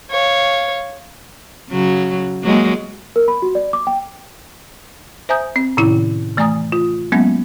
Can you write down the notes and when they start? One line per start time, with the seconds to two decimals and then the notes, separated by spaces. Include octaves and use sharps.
0.11 C#5 F5
1.70 C#3 F#3
2.44 F#3 G#3 A#3
3.16 A#4
3.28 B5
3.42 F#4
3.55 D5
3.73 D6
3.87 G5
5.29 C5 E5 G#5 A#5 D#6 G6
5.56 C4
5.77 A2 C3 D#3 C#4 E4
6.37 E3 A3 D5 G#5 A#5 D#6
6.72 F4
7.12 F#3 G#3 A#3 B3 C#4